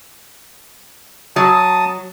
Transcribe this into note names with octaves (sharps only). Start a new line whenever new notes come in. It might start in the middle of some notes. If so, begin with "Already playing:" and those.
F#3 A5 D#6